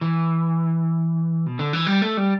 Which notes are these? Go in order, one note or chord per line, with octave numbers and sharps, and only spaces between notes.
E3
B2
D3
E3
G3
A3
G3